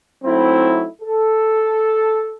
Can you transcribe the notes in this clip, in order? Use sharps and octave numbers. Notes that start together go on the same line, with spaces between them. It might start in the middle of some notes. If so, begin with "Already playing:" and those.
F#3 A3 C4 D#4 E4
A4